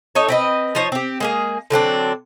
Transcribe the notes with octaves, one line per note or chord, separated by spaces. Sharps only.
D#4 A4 C#5
C4 B4 D#5
F3 D#4 C5 C#5
C4 G4
G#3 A#3 G#4
D3 F#3 C4 D4